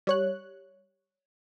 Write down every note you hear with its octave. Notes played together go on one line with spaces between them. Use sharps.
G3 C#5 F#6